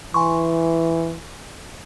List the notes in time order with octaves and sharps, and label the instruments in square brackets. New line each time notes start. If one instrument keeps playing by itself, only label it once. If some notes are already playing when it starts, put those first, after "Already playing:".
[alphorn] E3 [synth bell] G#5 C6 C#6